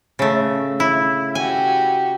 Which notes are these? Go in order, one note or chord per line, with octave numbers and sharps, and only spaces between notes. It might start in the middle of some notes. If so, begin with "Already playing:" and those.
C#3 A3
E4
F#4 G4 G#5